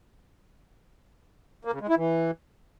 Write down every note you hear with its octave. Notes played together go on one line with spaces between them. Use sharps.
A#3
C#3
G#3
E4
E3